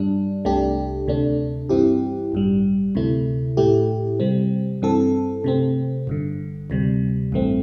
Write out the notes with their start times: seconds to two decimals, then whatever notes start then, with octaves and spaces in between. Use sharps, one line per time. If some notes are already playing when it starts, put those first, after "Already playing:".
Already playing: G2 G3 D4
0.45 C2 C3 A3 D4 G4
1.07 D2 C3 A3 D4
1.69 G2 E3 C4 E4 G4
2.32 A1 G2 G3
2.95 D2 C3 A3 E4
3.57 A2 A3 E4 G4
4.20 C3 G3 C4
4.82 G2 E3 C4 A4
5.44 C3 A3 C4
6.07 G1 G2 D3
6.70 D2 C3 G3
7.32 A1 G2 E3 A3 C4